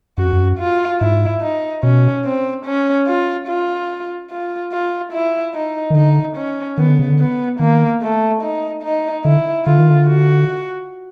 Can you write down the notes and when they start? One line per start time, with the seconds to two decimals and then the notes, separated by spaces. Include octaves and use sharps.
0.18 F#2 F#4
0.25 F2
0.33 F#2
0.59 F4
1.00 G#2 E4
1.42 D#4
1.83 B2 C#4
2.25 C4
2.65 C#4
3.07 F4
3.48 F4
4.31 F4
4.72 F4
5.12 E4
5.53 D#4
5.90 D#3
5.95 D3 D#4
6.36 C#4
6.78 D#3 B3
6.88 D3
6.99 C#3
7.09 D3
7.19 B3
7.60 D#3 A#3
8.02 A3
8.42 D#4
8.83 D#4
9.25 D3 E4
9.66 D3 F4
9.78 D#3
9.90 D3
10.07 F#4